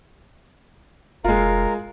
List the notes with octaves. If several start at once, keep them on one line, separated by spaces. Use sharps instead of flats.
F1 G#3 F4 A#4